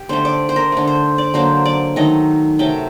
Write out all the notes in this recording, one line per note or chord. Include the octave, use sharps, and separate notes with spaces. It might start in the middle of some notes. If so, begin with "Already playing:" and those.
Already playing: G4
D3 A3 C5
D5
C5
A#4
D3 A3
C5
D5
D3 F#3 A#3 C5
D5
D#3 F#3 A3 D#5
C3 F#3 A3 G5